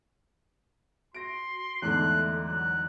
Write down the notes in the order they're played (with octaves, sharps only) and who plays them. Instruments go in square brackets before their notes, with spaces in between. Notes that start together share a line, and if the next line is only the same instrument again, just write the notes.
[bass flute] F#4 [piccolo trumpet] C6 [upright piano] A#6 D7
[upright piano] E2 G#2 D3 [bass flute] A3 [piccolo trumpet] F#6
[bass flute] F#3 [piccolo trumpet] F#6